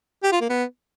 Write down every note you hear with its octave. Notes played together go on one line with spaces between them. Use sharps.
G4
F4
A#3
B3